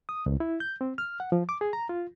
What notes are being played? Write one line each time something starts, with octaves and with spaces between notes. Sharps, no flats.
D#6
C#2
E4
G6
C4
F6
F#5
F3
D6
G#4
A#5
F4